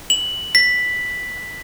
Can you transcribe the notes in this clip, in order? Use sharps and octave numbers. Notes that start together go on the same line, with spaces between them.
F#7
B6